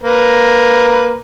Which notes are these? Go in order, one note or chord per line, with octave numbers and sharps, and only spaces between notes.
A#3 B4 A#5